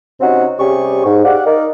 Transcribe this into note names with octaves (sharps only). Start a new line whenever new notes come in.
C3 C4 C#4 D#4 F#4
C3 G3 C#4 G4 G#4 C#6
G#2
G4 D5 F5 F#5
D#4 A#4 D5